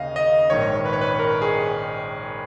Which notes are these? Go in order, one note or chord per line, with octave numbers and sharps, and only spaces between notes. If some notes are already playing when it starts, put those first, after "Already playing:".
Already playing: D#2 C#3 D#5 F5
D#5
A#1 G#2 D#3 C#5
B4
C#5
B4
A#4
G#4